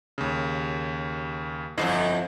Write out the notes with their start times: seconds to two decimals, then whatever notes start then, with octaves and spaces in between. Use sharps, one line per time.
0.18 D#2 C#3
1.78 G1 F2 G#2 E4 D#5 C7